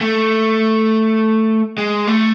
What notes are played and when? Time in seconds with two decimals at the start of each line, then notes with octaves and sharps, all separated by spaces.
0.01 A3
1.78 G#3
2.07 A3